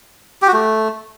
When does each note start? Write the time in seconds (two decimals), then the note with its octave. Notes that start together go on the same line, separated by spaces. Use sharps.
0.42 G4
0.48 F#4
0.53 A3